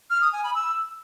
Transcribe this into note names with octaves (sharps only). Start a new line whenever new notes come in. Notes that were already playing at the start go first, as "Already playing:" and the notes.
F6
D#6
G#5
B5
E6